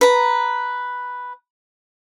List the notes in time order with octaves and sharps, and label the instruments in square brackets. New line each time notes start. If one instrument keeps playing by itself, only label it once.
[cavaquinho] B4 A#5